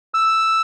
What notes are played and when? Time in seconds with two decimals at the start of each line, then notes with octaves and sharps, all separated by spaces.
0.14 E6